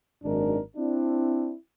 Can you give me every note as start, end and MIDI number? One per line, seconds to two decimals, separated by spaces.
0.24 0.59 32
0.24 0.59 42
0.24 0.59 51
0.24 0.59 56
0.24 0.59 62
0.24 0.59 70
0.77 1.54 60
0.77 1.54 62
0.77 1.54 64